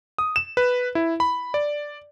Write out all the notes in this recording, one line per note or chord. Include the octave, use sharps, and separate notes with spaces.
D#6
E7
B4
E4
B5
D5